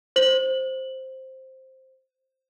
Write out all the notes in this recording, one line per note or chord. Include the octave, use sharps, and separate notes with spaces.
C5 F#7